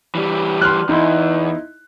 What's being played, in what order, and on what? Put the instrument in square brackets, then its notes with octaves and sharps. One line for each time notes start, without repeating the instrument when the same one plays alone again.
[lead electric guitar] E3 G3
[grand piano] C6 F6 F#6
[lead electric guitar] E2 [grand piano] D#4 E4 C6